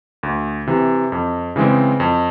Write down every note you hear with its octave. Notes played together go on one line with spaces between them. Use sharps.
D2
C3 E3
F2
C#3 E3 G#3 C4
F2